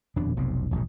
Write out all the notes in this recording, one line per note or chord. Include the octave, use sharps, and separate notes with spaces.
D#1 F2 B2 D4
F1 B1 F2 C3
E1 A#1 D#2 G#2